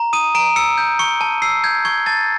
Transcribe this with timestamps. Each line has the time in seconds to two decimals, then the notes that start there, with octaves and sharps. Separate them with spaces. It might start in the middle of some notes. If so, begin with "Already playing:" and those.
Already playing: A#5
0.13 D#6 D#7
0.35 A#5 D7
0.56 E6 C#7
0.78 G6
0.99 C#6 C#7
1.21 A5
1.42 E6 C7
1.64 G6 G#6
1.85 C#6 G#6
2.06 A5 A6